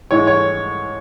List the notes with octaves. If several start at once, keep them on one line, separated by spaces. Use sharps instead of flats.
G#2 E3 G#3 C#5
C#5